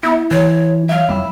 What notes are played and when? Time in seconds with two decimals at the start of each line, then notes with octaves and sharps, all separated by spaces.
0.03 B3 E4
0.31 E3 C#5
0.89 F#3 E5 F5
1.09 F1 G3 E4